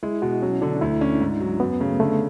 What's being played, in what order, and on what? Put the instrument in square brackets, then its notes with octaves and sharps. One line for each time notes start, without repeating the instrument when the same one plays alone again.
[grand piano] G#3 [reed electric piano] E4
[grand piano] B2 [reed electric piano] F#4
[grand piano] F#3 [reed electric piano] C#4
[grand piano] D3 [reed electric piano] D4
[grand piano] D2 [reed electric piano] E4
[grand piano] C#4 [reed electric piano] D4
[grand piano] G#2
F#3
[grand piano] F#2 [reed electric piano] B3
[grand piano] C#3 [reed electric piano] A3
[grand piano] D3 [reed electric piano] A3